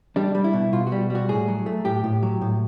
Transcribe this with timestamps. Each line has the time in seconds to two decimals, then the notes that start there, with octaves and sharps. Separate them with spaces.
0.16 G3 D4
0.35 G3
0.44 E4
0.53 B2
0.73 B2 F4
0.87 F#4
0.92 G3
1.10 G3
1.15 F#4
1.29 A2 G#4
1.48 F#3
1.66 A3
1.85 A2 G4
2.04 A2
2.23 F#3
2.41 A2